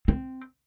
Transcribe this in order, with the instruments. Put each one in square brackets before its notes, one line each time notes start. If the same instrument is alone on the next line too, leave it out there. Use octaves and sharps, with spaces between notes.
[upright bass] C4